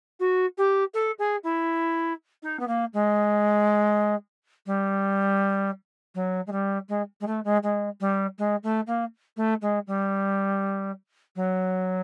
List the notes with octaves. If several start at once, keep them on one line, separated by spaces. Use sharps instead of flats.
F#4
G4
A4
G#4
E4
D#4
B3
A#3
G#3
G3
F#3
G#3
G3
G#3
G#3
A3
G#3
G#3
G3
G#3
A3
A#3
A3
G#3
G3
F#3